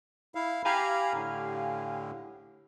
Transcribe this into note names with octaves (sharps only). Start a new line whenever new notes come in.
E4 F5
G4 F5 G#5 A#5 B5
A2 D3